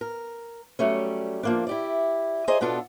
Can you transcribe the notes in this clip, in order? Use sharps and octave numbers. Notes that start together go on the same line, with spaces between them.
A#4
F#3 G3 A3 C#4
F3 A#3 D4
E4 G4 D5
G#4 C5 D5 D#5 G#5 A#5
B2 B3 D4 F4 A4